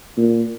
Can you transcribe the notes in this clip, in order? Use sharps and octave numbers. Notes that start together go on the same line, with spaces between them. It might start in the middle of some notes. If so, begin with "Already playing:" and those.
A#2